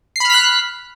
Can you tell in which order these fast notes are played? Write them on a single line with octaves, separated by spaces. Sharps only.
C7 B5 F6 B6 F#6